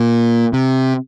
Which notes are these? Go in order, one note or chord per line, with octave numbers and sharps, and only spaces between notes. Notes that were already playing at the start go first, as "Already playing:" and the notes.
Already playing: A#2
C3